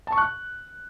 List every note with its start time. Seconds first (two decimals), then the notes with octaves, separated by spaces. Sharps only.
0.07 A5
0.12 C#6
0.18 F#6